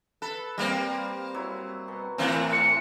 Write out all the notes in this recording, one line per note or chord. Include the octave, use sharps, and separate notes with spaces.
A4 B4
G3 A#3 C4
F#3 E4
B2
A2 E3 C4 A#4 E5 F#5
C#7